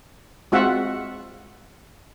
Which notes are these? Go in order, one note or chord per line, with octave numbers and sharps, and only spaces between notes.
G#3 C4 F4 F#4 E5 F#5